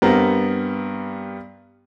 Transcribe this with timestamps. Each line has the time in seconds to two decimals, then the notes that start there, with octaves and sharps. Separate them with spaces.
0.02 G2 B3 C4 A#4